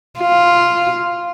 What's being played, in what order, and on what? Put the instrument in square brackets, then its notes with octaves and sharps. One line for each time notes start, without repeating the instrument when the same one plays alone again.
[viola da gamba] F4